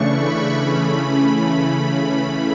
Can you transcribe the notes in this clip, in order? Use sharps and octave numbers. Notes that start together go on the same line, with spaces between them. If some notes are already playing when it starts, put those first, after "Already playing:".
Already playing: C#3 E3 A3 D4 C#6
B5
C#3 E3 A3 C#4